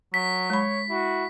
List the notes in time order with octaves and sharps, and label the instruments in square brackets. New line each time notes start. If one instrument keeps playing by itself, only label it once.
[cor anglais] F#3 [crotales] B6
[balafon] G#3 B5 [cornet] C#5
[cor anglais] E4 [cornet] F#4